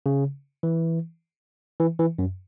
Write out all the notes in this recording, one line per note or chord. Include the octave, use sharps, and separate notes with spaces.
C#3
E3
E3
E3
F#2